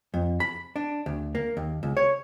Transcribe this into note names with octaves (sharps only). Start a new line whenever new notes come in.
F2
B5
D4
D2
A#3
D#2
C#2
C#5